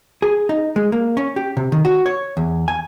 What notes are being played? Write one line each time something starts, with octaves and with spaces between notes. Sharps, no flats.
G#4
D#4
G#3
A#3
C#4
G4
C3
D#3
F#4
C#5
E2
G#5